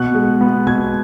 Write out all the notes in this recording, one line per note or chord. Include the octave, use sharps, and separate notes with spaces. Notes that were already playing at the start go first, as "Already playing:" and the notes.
Already playing: B2 F#6
G#3
B3
B2 G#6